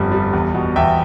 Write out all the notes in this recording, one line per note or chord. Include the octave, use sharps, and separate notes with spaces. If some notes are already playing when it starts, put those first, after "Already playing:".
Already playing: G1 F2 G3
G3
E2
B2
E2 E5 G5